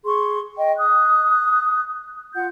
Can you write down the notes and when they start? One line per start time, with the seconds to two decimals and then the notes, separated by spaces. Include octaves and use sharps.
0.06 G#4 C6 C#6
0.57 D#5 G5
0.78 D#6 F#6
2.34 F4 F#5 G6